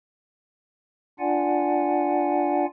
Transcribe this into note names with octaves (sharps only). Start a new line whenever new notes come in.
D4 F4 D5 F#5 G#5